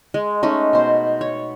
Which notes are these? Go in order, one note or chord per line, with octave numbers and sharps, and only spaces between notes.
G#3
G#3 A3 C#4 D#4
B2 C5
C#5